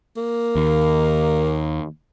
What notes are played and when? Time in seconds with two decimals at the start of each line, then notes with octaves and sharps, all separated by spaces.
0.17 A#3
0.56 D#2